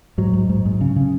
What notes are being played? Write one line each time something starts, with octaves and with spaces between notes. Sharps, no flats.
G#2 F#3
G#2
G#2
G#2
C#3
C#3